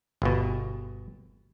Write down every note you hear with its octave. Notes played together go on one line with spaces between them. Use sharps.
G1 B2